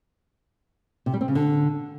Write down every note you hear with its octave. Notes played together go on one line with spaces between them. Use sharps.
C3
G3
C4
C#3
D3